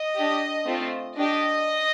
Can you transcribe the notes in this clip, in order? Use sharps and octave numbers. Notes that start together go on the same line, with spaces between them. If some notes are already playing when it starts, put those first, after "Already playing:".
Already playing: D#5
D4 G4
A3 C4 F4
D4 G4 D#5